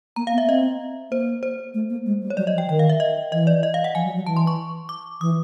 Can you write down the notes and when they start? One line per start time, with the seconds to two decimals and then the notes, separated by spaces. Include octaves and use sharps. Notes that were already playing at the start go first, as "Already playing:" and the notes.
0.16 A#3 A#5
0.27 F5
0.33 B3
0.38 E5
0.48 C4 D#5
1.11 A#3 C5
1.43 C5
1.74 A3
1.90 A#3
2.06 G#3
2.22 G3
2.30 C#5
2.37 F#3 D5
2.47 D#5
2.54 F3
2.58 G5
2.68 D#3 G5
2.79 F5
2.89 E5
3.00 D#5
3.32 E3 D#5
3.47 D5
3.63 D#5
3.74 F5
3.84 F#5
3.95 F3 G#5
4.05 F#3
4.15 F#3
4.26 E3 A5
4.37 C6
4.47 C#6
4.89 D6
5.21 E3 D#6